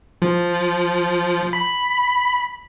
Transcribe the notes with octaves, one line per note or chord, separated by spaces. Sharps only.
F3
B5